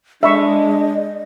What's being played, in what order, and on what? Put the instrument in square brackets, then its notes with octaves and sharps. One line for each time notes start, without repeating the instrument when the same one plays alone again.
[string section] G#3 [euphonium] D4 [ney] D#5 [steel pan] E5 B5 C#6